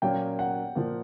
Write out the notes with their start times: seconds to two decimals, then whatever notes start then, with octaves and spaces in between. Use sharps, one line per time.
0.02 A#2 F#3 A#3 C#4 G5
0.39 F#5
0.75 A#2 F3 A#3